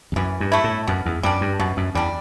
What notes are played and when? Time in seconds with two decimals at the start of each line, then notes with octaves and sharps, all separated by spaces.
0.12 E2
0.16 F#2 E3
0.40 G2
0.52 A3 E4
0.64 A2
0.87 F#2 B2
1.06 E2
1.23 F#2 G3 D4
1.41 G2
1.59 F#2 B2
1.77 F#2
1.95 E2 G3 D4